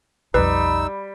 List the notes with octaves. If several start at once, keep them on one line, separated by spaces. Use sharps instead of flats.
B1 F2 G3 D#4 B4 E6